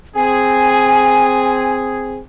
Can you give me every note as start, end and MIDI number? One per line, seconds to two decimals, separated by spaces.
0.16 2.19 60
0.16 2.19 68
0.16 1.75 80